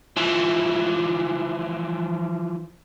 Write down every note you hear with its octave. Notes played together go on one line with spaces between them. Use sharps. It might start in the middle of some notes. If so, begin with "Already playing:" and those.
E3 F3